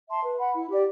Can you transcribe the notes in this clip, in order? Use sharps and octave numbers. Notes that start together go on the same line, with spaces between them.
E5 A5 C6
B4
F#5 B5
E4
G4 D5